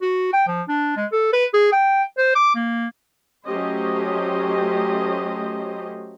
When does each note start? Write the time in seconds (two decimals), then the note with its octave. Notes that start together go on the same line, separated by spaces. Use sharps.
0.01 F#4
0.33 G5
0.47 F3
0.69 D4
0.96 G#3
1.12 A4
1.33 B4
1.54 G#4
1.72 G5
2.17 C5
2.35 D6
2.55 A#3
3.46 F#3 A3 C#4 G4 C5 D#5